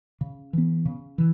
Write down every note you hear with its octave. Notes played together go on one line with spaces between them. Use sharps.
C#3
E3 B3
C#3
E3